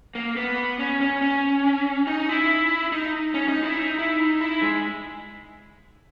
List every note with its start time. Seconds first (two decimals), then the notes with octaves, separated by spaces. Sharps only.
0.15 A#3
0.36 B3
0.79 C#4
1.01 C#4
1.22 C#4
2.07 D#4
2.29 E4
2.92 D#4
3.34 C#4
3.49 D#4
3.63 E4
3.78 D#4
3.99 E4
4.20 D#4
4.41 E4
4.62 G#3